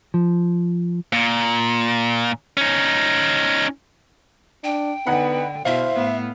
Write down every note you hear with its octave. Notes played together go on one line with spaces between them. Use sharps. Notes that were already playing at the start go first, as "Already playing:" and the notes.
F3
A#2
C#4 D#4
D4 G5
D3 B3 D#4 F#5 B5
B2 E4 C5 E5 F5
A2 B3